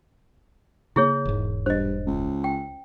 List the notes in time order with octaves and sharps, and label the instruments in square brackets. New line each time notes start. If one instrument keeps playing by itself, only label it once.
[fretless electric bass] C#3 A#3 [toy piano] E4 G#4 C#5
[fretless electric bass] E1 G#2
[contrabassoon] G2 [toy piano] C5 D#5
[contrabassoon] C#2
[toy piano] G5